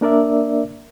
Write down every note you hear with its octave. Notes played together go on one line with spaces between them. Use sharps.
A#3 D4 A#4 D5 E5